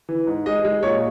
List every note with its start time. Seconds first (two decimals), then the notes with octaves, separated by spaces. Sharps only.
0.09 E3
0.27 G#2
0.46 G#3 D#5
0.65 G#3
0.83 A#2 C#5